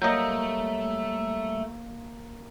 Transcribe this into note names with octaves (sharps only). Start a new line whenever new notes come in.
F#3 G3 A3 A#3 D#5 E6 G6